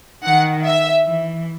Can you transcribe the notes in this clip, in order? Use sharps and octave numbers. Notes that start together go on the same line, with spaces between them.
D#3 F#5
E5
E3